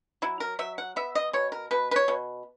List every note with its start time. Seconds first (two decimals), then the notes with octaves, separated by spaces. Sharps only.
0.22 F#3 E4
0.40 A#4
0.59 F#3 E5
0.78 F#5
0.96 B3 E5
1.15 D#5
1.33 B2 C#5
1.52 A#4
1.71 B2 B4
1.91 B4
1.96 C#5
2.08 B2